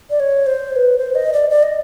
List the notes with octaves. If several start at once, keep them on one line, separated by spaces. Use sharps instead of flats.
D5
C#5
C5
C5
B4
C5
D#5
D5
D5
D#5